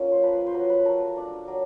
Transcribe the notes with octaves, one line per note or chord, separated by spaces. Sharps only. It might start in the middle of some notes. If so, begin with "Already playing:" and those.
Already playing: A#3 C#4 F4
C5
F3 B4
C5
F#3 B4
B4
A3 A#4
D4
F#3